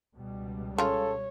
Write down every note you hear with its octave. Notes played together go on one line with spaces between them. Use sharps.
C#2 B2 G3
C#3 F4 A4 C#5